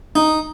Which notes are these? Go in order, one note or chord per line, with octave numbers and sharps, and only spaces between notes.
D#4